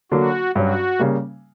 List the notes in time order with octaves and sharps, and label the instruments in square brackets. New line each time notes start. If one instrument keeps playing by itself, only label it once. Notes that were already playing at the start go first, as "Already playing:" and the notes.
[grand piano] D3 F#3 A#3 [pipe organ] F#4
[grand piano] G2 F#3 C#4 [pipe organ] F#4
[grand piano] C#3 G3 A#3